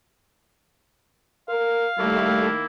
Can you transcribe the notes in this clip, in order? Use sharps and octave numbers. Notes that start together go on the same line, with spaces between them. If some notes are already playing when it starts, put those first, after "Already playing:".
A#4 F5
D#3 G3 A3 A#3 E4